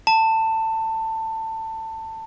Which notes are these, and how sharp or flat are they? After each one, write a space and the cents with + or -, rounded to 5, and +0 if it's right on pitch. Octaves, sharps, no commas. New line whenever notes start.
A5 +20